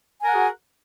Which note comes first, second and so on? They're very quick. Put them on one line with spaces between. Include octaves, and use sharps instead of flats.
G#5 A#4 F#5 G#4 F#4